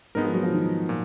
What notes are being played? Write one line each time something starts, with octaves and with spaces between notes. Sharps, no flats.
G#2 G#3 B3 D#4 A#4
F3
F#3
F3
D#3
A#2